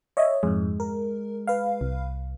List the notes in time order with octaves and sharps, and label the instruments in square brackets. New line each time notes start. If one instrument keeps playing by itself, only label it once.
[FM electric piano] C#5 D#5 E5
[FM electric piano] F2 G#2 [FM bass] G#3
[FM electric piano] A#4
B4 F5
[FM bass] C2